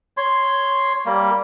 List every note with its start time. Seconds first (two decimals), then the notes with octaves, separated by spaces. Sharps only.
0.17 C#5 C6
1.05 G3 A#3